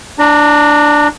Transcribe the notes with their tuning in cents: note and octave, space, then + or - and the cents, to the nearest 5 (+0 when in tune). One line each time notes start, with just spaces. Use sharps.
D4 +0 A#5 -35